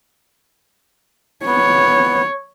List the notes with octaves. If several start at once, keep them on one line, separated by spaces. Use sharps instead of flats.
B3 C#5